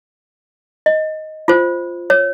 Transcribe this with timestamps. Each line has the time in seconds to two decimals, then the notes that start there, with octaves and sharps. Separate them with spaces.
0.86 D#5
1.48 F4 C5
2.10 C#5